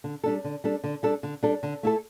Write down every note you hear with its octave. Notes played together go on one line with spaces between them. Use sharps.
D3
G3 D4 A4
D3
G3 D4 A4
D3
G3 D4 A4
D3
G3 D4 A4
D3
A3 E4 A4